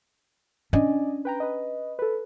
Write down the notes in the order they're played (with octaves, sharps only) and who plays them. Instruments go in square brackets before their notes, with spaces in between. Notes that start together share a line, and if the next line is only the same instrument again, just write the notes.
[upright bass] C#4 D4 [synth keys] D5 D#5 G#5
[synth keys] B4 G5 A#5
B4 D#5
A4 B4